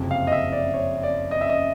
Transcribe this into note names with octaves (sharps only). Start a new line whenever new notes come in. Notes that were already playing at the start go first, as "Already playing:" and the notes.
Already playing: F#1 F2 C3
F5
D#5
E5
D5
C#5
D5
D#5
E5
D#5